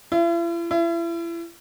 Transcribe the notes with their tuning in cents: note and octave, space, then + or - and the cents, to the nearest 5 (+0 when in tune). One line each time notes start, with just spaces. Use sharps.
E4 +45
E4 +35